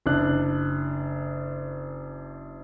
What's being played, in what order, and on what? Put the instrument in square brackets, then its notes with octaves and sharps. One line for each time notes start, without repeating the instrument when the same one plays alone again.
[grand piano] F#1 D4 F#6